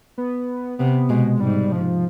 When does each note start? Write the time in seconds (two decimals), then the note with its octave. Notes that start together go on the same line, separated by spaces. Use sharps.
0.18 B3
0.79 C3 B3
1.10 B2 G#3
1.40 G#2 G3
1.72 F3